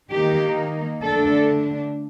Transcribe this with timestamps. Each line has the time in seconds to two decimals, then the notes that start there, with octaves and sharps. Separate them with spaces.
0.11 D#3 A#3 D#4 G4
1.03 D3 A3 D4 A4